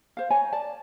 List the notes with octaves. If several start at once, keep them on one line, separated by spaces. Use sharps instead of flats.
C5 F5
C#5 G#5 A#5
D5 A5